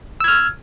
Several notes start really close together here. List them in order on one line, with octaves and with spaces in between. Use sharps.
E6 G#6 F6